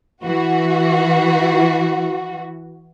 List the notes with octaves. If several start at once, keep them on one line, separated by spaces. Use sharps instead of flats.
E3 F#4